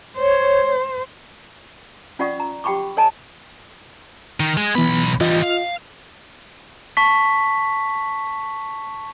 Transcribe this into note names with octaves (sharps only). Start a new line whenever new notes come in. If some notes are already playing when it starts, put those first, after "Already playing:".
C5 C#5
C#4 F4 D5 F#5 C#6 D#6
A#5
G4 F#5 G5 B5 C#6 D6
A4 C#5 D#5 G#5 A5
D#3
G#3
B1 E3 B3 B5
E3 G3 F4 D#5
F5
A5 C#6 B6